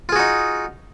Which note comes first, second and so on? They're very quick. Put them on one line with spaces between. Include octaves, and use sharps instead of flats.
F4 G#4 F#4 D#4